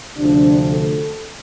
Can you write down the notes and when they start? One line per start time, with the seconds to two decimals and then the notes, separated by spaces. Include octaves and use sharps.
0.18 D2 C3 F3 D4
0.72 A4